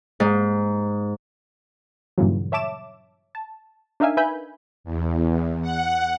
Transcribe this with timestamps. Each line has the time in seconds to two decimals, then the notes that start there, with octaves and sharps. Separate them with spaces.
0.20 G#2
2.18 G2 A#2 C#3 E3 F#3
2.52 C#5 E5 A5 D6 E7
3.35 A5
4.00 D4 D#4 A#4 E5 F5 G#5
4.17 B4 E5 G#5 B5 G6
4.84 E2
5.62 F#5